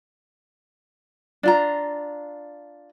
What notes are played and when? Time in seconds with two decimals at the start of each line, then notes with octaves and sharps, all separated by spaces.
1.43 D4 F4 A#5